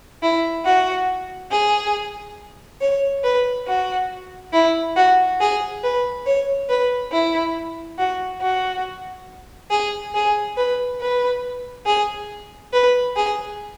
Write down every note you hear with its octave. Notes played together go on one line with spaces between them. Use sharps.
E4
F#4
G#4
C#5
B4
F#4
E4
F#4
G#4
B4
C#5
B4
E4
F#4
F#4
G#4
G#4
B4
B4
G#4
B4
G#4